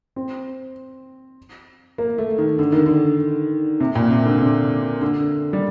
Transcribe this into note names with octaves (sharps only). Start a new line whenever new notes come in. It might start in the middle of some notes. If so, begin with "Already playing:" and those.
C4
A#3
A3
D#3
D3
D#3
D3
C3
A#2
C3
D3
C3
D3
G3